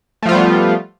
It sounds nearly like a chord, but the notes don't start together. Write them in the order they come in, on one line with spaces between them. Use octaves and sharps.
A3 F3 F4 G3 B3